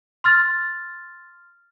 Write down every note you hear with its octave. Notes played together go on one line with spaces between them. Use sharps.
C6 F6 A6